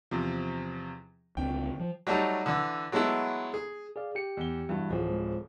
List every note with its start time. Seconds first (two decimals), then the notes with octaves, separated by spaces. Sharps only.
0.11 E2 C3 F3
1.37 C#2 D3 C4 G5
1.80 F3
2.07 F#3 G3 A3 D#4
2.46 D3 E3
2.92 F#3 G#3 A3 B3 E4
3.54 G#4
3.96 G#4 D5 F5
4.15 G4 G5 C#7
4.37 E2 G7
4.69 G2 E3 E4 F#4
4.89 D1 F3 G#4
5.10 G#3